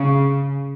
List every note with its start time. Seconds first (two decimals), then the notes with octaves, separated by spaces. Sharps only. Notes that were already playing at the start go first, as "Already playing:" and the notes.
Already playing: C#3